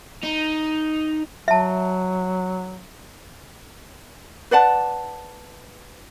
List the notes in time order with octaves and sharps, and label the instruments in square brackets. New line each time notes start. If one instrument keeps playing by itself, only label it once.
[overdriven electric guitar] D#4
[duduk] F#3 [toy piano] E5 A5
[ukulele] B4 D5 F#5 A5